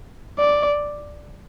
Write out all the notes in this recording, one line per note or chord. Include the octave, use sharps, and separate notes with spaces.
D5